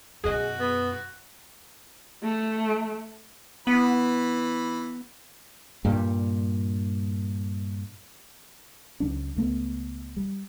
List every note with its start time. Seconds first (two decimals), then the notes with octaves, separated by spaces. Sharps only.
0.24 F#2 B2 F#4 G#4 D#5
0.60 B3
2.23 A3
3.67 E3 B3 B5
5.85 G2 A#2 G3
9.00 C#2 F#3 C#4 D4
9.37 C#2 A3 B3
10.17 G3